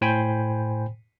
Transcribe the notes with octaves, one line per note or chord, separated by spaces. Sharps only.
A2 C5 G5 G#5 B5